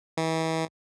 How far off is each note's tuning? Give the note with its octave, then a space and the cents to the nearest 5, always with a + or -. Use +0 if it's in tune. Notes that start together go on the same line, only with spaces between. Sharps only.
E3 -35